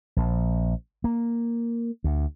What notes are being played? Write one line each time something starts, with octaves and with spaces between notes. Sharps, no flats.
A#1
A#3
D2